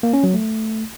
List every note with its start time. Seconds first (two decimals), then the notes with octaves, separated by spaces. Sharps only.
0.03 A#3
0.13 C#4
0.24 F#3
0.34 A3